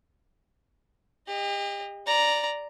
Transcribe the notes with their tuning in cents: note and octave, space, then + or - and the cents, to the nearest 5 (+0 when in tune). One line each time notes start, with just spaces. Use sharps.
G4 +40 D#5 +0
D5 +0 A#5 +0